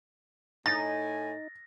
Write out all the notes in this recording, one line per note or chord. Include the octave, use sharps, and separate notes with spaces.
A2 D#4 G#5 A6 A#6